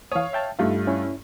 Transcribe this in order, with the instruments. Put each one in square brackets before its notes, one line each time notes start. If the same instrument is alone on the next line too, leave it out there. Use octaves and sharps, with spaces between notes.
[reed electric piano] E3 D#6 [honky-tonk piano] C#5 F5
[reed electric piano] E5 G5 A5
[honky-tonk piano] G2 A3 F4 [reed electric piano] D#4
[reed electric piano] C#4 E4